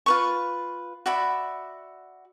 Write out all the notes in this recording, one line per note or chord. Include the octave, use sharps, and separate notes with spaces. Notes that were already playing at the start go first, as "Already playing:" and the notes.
F4 B4 C#6
F#4 D5 E5 B5